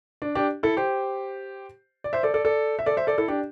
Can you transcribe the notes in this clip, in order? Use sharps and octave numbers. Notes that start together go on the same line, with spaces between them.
D4
D4 G4
E4 A4
G4 C5
D5
C5 E5
A4 D5
A4 D5
A4 D5
E5
A4 D5
C5 E5
A4 D5
E4 A4
D4 G4